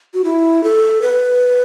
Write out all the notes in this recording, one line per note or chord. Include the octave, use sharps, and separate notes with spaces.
F#4
E4
A4
B4